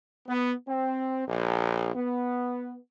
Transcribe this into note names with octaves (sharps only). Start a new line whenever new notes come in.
B3
C4
A#1
B3